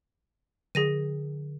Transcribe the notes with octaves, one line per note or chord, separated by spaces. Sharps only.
D3 G#4 A#6 D#7